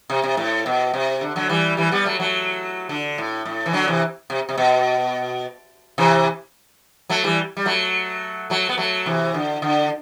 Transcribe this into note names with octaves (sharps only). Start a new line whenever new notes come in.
C3
C3
A2
B2
C3
D3
D3 F#3
E3 G3
E3 G3
G3 B3
F#3 A3
F#3 A3
D3
A2
A2
E3
D3 F#3
C3 E3
C3
C3
B2
C3 E3
F#3 A3
E3 G3
G3
F#3 A3
F#3 A3
B3
F#3 A3
C3 E3
D3
D3